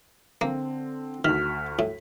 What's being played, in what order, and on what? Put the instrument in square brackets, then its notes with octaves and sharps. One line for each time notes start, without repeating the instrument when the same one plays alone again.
[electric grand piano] D3 C4 [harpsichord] A#3
[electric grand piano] D2 F#4 B6 [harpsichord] D#3 [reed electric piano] F6
[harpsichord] A2